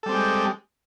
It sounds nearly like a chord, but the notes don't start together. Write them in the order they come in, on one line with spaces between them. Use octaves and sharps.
A4 G3 C4 G4 G#3